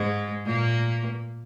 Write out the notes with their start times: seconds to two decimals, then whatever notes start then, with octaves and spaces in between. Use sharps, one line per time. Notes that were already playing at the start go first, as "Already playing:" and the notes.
Already playing: G#2 G#3
0.46 A#2 A#3